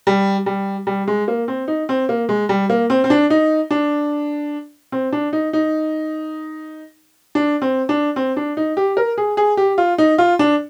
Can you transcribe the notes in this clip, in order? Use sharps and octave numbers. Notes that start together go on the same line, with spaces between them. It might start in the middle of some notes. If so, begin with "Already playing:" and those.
G3
G3
G3
G#3
A#3
C4
D#4
C4
A#3
G#3
G3
A#3
C4
C4
D4
D#4
D4
C4
D4
D#4
D#4
D4
C4
D4
C4
D4
D#4
G4
A#4
G#4
G#4
G4
F4
D#4
F4
D4